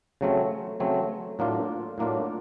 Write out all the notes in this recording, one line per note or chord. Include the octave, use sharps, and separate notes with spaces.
C#3 F#3 A3 C4
C#3 F#3 A3 C4
A2 F#3 A#3 D4 F4
A2 F#3 A#3 D4 F4